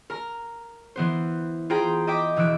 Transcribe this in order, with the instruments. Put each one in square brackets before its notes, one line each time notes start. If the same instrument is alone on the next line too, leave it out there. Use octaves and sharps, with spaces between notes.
[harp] A#4 A#5
E3 B3 C5
F4 G#4 C5 G5 A#5 B5
D#5 E5 G5 D6 B6
E1 E3 E6 F#6 D7